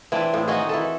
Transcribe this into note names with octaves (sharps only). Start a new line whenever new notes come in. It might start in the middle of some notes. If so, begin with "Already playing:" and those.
E3 C4 D4
A2
D#3 D#4 F#4 G#4
E3 A4